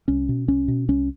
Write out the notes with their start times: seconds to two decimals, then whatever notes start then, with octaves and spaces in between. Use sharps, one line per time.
0.08 C2 C#4
0.29 B2
0.48 C2 C#4
0.68 B2
0.88 C2 C#4